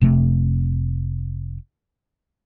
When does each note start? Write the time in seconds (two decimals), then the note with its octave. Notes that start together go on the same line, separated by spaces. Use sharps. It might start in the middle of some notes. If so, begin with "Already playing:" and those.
0.01 F1 C3 A3